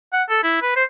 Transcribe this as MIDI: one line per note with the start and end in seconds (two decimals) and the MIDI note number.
0.13 0.23 78
0.30 0.39 69
0.43 0.60 64
0.62 0.72 71
0.76 0.84 72